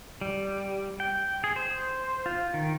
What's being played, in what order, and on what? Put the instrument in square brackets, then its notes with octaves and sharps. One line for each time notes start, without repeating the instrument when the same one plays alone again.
[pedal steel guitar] G3
G5
G#4
C5
F4
D#3